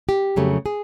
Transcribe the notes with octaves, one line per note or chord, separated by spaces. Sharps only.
G4
F2 C#3 F#3 A3
G#4